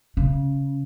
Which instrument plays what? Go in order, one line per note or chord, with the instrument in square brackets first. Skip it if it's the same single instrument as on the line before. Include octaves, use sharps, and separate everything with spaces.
[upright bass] C#3